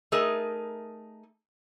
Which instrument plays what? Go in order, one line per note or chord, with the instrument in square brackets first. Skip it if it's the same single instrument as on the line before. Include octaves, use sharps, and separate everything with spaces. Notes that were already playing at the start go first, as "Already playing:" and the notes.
[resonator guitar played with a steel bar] A3 D#4 G#4 A#4